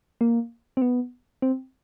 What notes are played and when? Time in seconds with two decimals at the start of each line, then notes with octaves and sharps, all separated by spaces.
0.21 A#3
0.77 C4
0.82 B3
1.42 C4